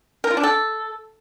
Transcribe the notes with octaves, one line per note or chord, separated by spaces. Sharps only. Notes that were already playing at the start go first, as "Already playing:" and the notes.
A#4
F4
D4
A4